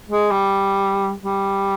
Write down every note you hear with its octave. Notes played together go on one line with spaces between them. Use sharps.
G#3
G3
G3